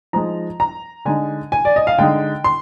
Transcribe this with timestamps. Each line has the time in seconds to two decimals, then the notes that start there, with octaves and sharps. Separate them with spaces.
0.13 F3 G#3 D#4 A#5
0.60 A#5
1.05 D3 G#3 D#4 G#5
1.52 G#5
1.65 D5
1.76 D#5
1.87 F5
1.98 D3 G#3 D#4 G5
2.44 C6